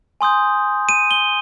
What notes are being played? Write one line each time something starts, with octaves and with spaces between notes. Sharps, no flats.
G#5 C6 D#6 G6
D#7
G7